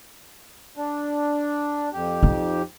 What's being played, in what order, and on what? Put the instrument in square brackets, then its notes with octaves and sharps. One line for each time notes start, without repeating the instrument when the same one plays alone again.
[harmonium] D4
F2 G4
[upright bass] D#4